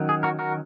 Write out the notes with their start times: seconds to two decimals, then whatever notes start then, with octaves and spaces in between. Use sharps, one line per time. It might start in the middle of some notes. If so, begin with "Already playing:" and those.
Already playing: D#3 F#3 C#4
0.09 G#4
0.23 F#4 A#4
0.39 F#4 A#4